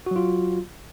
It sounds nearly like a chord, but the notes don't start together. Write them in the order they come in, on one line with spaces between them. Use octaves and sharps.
F#4 F#3 F4